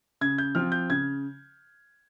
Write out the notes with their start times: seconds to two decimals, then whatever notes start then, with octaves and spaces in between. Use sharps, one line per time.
0.21 C#3 G#6
0.38 G6
0.55 F3 C4 F4 F6
0.72 G6
0.90 C#3 G#6